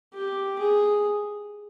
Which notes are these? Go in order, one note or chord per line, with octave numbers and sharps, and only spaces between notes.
G4
G#4